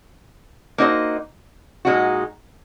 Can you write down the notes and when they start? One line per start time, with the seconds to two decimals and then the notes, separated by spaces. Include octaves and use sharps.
0.78 A#3 D#4 F#4 C5 D#5
1.85 A#2 G#3 D#4 F#4